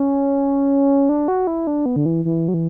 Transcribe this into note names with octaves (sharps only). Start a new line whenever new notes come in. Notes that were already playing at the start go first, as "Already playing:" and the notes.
Already playing: C#4
D4
F#4
E4
D4
B3
D3
E3
E3
F#3
E3